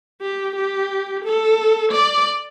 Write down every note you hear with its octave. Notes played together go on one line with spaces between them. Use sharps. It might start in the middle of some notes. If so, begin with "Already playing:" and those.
G4
G4
A4
D5